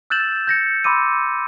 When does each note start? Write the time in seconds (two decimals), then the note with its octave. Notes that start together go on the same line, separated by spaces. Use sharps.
0.10 E6 F#6 G6 A6 E7 F#7
0.47 G6 A#6 C#7
0.84 B5 C6 D6 E6 D#7